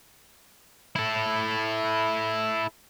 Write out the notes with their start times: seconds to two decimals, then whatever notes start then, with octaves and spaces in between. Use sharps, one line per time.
0.96 E4 A4